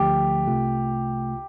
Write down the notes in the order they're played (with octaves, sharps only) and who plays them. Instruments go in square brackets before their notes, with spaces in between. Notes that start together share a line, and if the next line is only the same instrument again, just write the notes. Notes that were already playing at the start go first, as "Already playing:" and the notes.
Already playing: [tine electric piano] D2 D3 F3 A3 [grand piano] G4
[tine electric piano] C2 C3 A3 F4